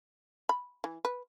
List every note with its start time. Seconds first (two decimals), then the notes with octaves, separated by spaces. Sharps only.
0.49 B5
0.84 E3
1.05 B4